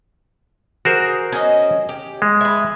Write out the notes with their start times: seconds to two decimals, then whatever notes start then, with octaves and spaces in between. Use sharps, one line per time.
0.85 F#4 G#4 A#4 C5
1.32 C#4 D#5
1.89 G4
2.22 G#3
2.41 B4 E5